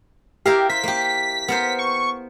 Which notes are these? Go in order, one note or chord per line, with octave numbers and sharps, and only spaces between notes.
E4 G4 A#4 F5
C5 B6
A#3 G4
B3 A#4 C5
C#6